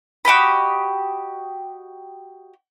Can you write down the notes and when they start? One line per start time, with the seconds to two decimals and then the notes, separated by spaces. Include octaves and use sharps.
0.25 F#4 G4 D#5 B5